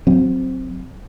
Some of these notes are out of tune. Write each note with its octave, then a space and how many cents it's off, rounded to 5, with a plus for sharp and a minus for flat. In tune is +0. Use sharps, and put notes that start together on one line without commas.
F#3 +0 C4 +0